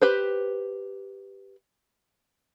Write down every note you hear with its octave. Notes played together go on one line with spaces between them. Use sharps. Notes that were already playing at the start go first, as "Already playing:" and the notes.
G4 B4 C5